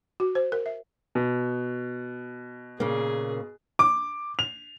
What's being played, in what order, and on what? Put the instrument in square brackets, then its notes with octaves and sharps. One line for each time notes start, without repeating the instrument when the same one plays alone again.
[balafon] F#4
C5
A#4
E5
[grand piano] B2
[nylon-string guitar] A#2 C#3 A#3 [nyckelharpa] G#4
[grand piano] D6
F7